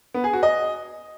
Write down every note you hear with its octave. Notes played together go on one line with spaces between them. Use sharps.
B3
G#4
F#4
D#5